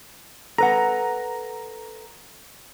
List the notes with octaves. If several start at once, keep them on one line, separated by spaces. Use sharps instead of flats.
A4 B4 F#5 A#5